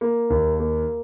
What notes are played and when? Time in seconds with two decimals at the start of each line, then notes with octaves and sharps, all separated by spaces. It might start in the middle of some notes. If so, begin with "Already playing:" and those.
0.01 A#3
0.30 D#2
0.60 A#3